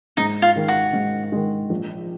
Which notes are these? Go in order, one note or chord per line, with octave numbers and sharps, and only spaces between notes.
G#2 D#4
F4
D#3 G#3
F#4
G#2
D#3 G#3
A#1